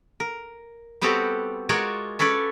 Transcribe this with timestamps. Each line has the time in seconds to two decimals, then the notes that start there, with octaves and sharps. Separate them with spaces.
0.20 A#4
1.01 G3 B3 C4 F#4 G4 A4
1.69 G#3 F4 F#4 A#4 C#5 D5
2.19 C#4 A4 B4 C#5 D5